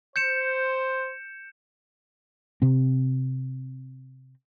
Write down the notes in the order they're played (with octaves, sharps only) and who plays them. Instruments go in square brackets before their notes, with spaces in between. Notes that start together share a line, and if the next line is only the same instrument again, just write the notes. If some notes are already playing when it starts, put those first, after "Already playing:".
[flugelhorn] C5 [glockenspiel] G6 C#7 E7
[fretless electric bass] C3 C4